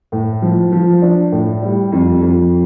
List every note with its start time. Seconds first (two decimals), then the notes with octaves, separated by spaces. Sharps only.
0.12 A2
0.42 F3
0.72 F3
1.02 D4
1.32 A2
1.62 G3
1.92 F2
2.22 F2